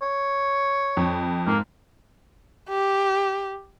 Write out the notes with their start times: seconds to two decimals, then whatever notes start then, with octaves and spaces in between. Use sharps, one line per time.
0.02 C#5
0.97 F2
1.47 G#2 A#3
2.69 G4